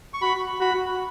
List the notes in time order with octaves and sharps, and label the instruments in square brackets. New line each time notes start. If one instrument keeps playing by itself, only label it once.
[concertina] C#6
[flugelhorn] F#4 [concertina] B5
[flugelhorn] F#4 [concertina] B5